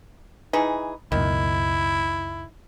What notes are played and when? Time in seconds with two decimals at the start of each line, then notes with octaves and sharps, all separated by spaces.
0.53 E3 D#4 G#4
1.12 C#2 F#2 B2 D#3 E4